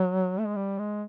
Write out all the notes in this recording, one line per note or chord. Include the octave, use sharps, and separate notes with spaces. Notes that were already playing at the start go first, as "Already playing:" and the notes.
Already playing: F#3
A3
G#3
G3
G#3